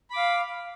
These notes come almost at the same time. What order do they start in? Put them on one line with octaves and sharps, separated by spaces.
B5 D6 F5